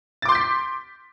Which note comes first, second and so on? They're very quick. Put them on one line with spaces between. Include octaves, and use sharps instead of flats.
A6 D6 C6 G6 B6